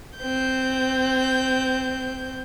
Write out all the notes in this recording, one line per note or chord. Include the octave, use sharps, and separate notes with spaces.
C4 G6